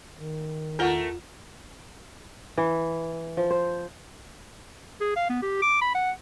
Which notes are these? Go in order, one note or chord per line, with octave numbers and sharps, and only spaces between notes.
D#3
E2 A3 F4 A#4 F#5
E3
F3
C5
G#4
F5
B3
G4
D6
B5
F#5